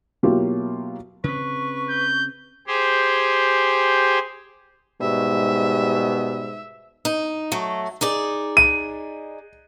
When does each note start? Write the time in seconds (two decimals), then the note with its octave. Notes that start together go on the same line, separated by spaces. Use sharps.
0.23 B2 F#3 A#3 E4 F4 G4
1.24 C#3 C4 B4 C#6
1.90 G6
2.67 G4 G#4 C5
5.01 G#2 B2 G3 E5
7.05 D#4
7.52 F#3 A3
8.01 D#4 G#4 D5
8.57 D#7